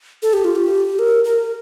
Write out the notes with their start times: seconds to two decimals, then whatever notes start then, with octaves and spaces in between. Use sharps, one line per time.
0.22 A4
0.33 G4
0.44 F4
0.56 G4
0.99 A#4
1.24 A#4